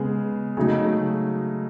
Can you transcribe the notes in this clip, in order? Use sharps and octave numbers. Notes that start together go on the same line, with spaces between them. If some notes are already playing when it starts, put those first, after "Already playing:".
Already playing: C#3 G#3 B3
C#3 F#3 A3 D#4